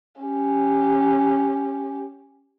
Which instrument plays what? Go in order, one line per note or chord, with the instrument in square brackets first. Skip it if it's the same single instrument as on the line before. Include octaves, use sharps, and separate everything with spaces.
[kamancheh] C#4 G4